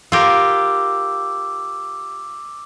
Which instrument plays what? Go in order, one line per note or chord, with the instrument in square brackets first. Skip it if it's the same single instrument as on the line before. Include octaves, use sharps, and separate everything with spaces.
[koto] F4 G4 A#4 [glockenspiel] D6 E6